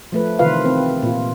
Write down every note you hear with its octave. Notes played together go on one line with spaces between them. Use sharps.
F3 A3 B4
C3 D#3 E3 F4 B4 F5
C4 B4
A#2 F4